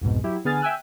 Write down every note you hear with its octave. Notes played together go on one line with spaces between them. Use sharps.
C2 F2 G#2 B2
F#3 E4 G4
D3 B3 G#4 G#5 F6 A6
E5 G5 G#5 E6 F#6